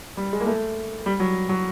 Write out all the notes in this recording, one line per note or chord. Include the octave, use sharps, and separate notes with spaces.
G3
G#3
A#3
A3
G3
F#3
F#3